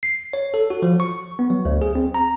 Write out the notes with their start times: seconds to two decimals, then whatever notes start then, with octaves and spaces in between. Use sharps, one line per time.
0.03 C7
0.33 C#5
0.54 A4
0.70 F#4
0.82 F3
1.00 C#6
1.39 B3
1.50 F#3
1.65 D2
1.82 G#4
1.95 C4
2.14 A#5